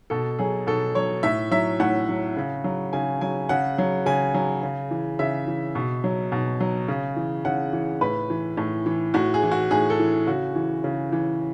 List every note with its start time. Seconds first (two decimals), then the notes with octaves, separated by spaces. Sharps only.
0.10 B2 A4
0.39 F#3 G#4
0.67 B2 A4
0.95 F#3 C#5
1.23 A2 E5
1.51 F#3 E5
1.80 A2 F#5
2.09 F#3
2.37 C#3
2.64 F#3
2.93 C#3 G#5
3.21 F#3 G#5
3.49 C#3 F#5
3.78 F#3
4.06 C#3 G#5
4.34 F#3
4.63 C#3
4.91 E3
5.19 C#3 E5
5.47 E3
5.75 B2
6.04 F#3
6.32 B2
6.60 F#3
6.88 C#3
7.16 E3
7.45 C#3 F#5
7.73 E3
8.01 A2 B4
8.30 E3
8.57 A2
8.86 E3
9.14 A2 F#4
9.34 G#4
9.43 E3
9.52 F#4
9.71 A2 G#4
9.90 A4
10.00 E3
10.27 C#3 F#4
10.56 E3
10.84 C#3
11.12 E3